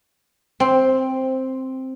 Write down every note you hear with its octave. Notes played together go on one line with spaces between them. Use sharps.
C4